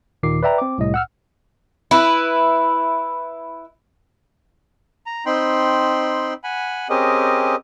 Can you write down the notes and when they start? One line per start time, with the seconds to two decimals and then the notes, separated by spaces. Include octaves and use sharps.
0.23 D#2 A#2 D#3 D6 C7
0.43 B4 D5 E5 G5 A#5
0.58 C4 D6
0.78 C2 A2 D#5
0.94 F#5 E6 F6
1.91 E4 B4
5.06 A#5
5.26 C4 D#4 G5 B5 C6
6.44 F#5 G#5 B5
6.90 C4 C#4 G4 G#4 A#4 D#5